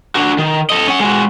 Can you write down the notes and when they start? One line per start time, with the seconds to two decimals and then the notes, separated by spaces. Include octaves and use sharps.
0.15 D4 F#4
0.38 D#3
0.70 A4 D#5
0.87 C#4 F#5
1.00 G#3 F#4